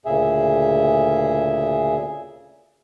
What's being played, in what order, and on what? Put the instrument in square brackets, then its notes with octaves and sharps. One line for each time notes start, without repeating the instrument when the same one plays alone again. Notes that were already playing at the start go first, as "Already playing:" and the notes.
[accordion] D2 A#2 C#3 G#4 E5